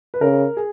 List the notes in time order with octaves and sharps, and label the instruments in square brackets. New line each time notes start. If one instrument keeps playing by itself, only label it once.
[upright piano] B4
[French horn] C#3 [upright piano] A#4
[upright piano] G#4